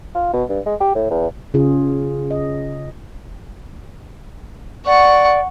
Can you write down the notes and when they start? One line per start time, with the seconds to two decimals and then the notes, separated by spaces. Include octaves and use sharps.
0.15 F4
0.33 B2
0.49 G2
0.66 G#3
0.80 G4
0.95 A2
1.10 E2
1.54 C#3 C#4 F4 G#4
2.31 D#5
4.86 D5 F#5 C#6